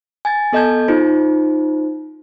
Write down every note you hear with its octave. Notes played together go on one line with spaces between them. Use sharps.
G#5 G#6 A6
B3 A4 D#5 A5 G6 G#6
D#4 F4 C5